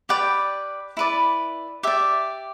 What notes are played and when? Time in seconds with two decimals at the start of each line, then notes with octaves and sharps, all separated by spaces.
0.09 G4 B4 D5 G5
0.97 E4 B4 D5
1.83 G4 D5 E5